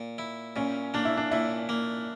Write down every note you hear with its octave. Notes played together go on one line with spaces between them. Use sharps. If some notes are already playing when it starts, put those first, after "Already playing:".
Already playing: A#2
E4
A#2 C#4
A#3 D4
E4
D4
A#2 E4
A#3